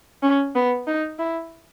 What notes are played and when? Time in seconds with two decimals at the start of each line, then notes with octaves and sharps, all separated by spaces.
0.22 C#4
0.55 B3
0.87 D#4
1.19 E4